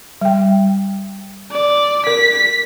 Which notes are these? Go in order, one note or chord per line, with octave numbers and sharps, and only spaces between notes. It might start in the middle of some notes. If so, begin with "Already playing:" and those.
G3 G5
D5
A#4 B6